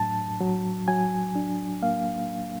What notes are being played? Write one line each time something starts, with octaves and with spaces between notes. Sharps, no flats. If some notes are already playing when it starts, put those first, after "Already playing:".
Already playing: A2 F#3 D4 A5
F#3
F#3 G#5
D4
A#3 F5